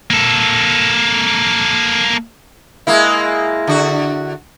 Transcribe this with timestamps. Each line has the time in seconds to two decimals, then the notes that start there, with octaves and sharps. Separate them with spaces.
0.10 A#3 A4
2.87 G#3 A#3 E4
3.67 D3 F#4